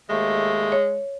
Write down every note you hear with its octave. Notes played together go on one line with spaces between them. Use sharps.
D#2 G#3 A3
C#5